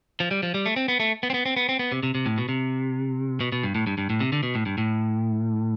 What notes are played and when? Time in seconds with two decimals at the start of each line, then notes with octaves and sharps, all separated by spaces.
0.20 F3
0.31 G3
0.43 F3
0.54 G3
0.66 A3
0.76 C4
0.88 B3
1.00 A3
1.23 B3
1.30 C4
1.34 B3
1.46 C4
1.57 B3
1.69 C4
1.79 B3
1.92 C3
2.03 C3
2.15 C3
2.26 A2
2.38 B2
2.49 C3
3.41 B2
3.52 B2
3.63 G2
3.75 A2
3.87 G2
3.98 G2
4.10 A2
4.20 C3
4.32 D3
4.43 B2
4.55 A2
4.66 G2
4.78 A2